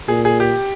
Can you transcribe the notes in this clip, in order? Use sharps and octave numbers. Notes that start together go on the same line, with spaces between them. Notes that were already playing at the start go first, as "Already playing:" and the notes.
A#2 G#4
G#4
G4